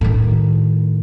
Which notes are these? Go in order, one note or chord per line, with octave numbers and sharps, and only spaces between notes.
A2 D#3